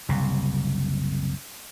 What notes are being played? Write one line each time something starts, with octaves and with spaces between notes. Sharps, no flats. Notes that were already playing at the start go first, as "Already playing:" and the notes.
F#1 C2 C3